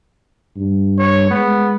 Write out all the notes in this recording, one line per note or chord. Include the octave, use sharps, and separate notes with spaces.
G2
C#5
G#3 B3